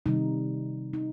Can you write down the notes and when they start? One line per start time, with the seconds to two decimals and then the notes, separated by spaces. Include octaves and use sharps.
0.06 C3 D#3 G3 D#4
0.93 D#4